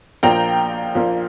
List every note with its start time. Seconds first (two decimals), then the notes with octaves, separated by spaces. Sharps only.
0.23 A#1 A#2 F3 A#3 G5 A#5
0.95 A#1 A#2 F3 A#3